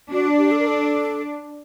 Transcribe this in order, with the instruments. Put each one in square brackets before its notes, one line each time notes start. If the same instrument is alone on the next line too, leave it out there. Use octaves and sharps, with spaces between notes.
[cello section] D4 [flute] F#4
[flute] G4
A4
A#4
A4